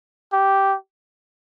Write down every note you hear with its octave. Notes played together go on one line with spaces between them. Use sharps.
G4